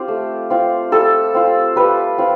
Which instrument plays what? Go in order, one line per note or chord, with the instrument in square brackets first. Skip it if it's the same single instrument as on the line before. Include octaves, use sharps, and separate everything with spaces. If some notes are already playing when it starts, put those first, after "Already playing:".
Already playing: [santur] C4 F4 G4
A3
C4 F4
G3 A4
C4 F4
G3 B4
C4 F4